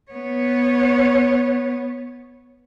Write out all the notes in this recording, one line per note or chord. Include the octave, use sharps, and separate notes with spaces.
B3 C#5